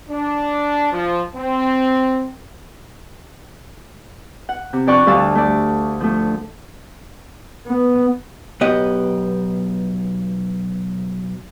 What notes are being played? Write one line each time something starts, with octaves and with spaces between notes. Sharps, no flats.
D4
F3
C4
F#5
C3
F2 D4 D5 G5 C#6 F#6
D2 G3 D4 F5 A5 E6
A3 D5
F3 A3
B3
B1 B3 G4 D#5